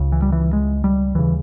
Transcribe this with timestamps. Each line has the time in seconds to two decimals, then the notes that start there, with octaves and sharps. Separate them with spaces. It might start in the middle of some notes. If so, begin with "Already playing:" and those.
Already playing: C#2 C#3
0.12 E3
0.22 G3
0.32 E3
0.53 G#3
0.84 G3
1.15 D#2 C#3 E3